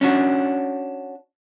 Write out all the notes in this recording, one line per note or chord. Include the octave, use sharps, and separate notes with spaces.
C#4 D4 F#4